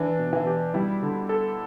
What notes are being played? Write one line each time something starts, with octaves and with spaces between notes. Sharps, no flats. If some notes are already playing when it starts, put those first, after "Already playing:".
Already playing: E3 D4
B2
E3
G4
G3 E4
D3
A4